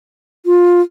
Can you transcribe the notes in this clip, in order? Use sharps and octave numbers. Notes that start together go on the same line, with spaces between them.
F4